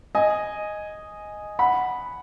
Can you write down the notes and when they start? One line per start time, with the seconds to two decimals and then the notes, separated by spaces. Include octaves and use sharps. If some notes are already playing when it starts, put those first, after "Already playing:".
0.15 D#5 G#5
1.59 F#5 B5